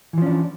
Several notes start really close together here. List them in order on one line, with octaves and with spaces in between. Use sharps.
E3 F3 C#4 D4